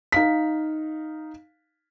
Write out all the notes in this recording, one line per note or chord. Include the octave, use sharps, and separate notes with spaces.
D#4 F5 B6